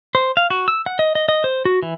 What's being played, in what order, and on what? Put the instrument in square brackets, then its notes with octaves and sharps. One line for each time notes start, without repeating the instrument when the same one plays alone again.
[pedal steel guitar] C5
F5
F#4
E6
F#5
D#5
D#5
D#5
C5
F#4
E3